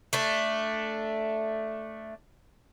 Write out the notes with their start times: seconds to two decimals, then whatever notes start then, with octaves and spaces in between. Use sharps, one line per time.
0.13 A3 D4